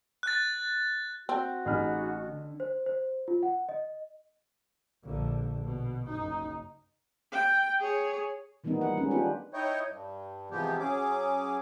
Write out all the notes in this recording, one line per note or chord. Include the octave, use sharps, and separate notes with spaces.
F#6 A6
C4 F#4
A1 D#4 G#4 B5 F6
D3
C5
C5
F4
F#5
D#5
A#1 D3
B2
F#1 D#4
G5
G#4 C#5
D#3 E3 G3 A#3 B3 D#4
G3 F#5
G3 G#3 C#4
B3 D4 F4 G4 B4
D#4 E4 C#5 D#5 G5
G2
C3 E3 F3 G#3 B3 G4
F#3 C#4 G#4 D6